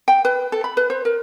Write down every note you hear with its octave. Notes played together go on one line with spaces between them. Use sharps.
G5
B4
A4
B5
B4
C5
A#4